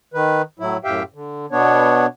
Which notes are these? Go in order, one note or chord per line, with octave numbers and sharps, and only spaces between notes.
D#3 B4
A2 F#3 E4
F#2 A2 G4 E5 F5 G5
D3
B2 B3 D4 C#5